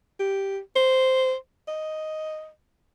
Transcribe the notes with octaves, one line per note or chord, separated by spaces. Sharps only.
G4
C5
D#5